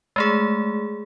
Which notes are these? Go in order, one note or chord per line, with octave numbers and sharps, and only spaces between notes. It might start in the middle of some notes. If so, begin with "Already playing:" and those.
G#3 A3 G#4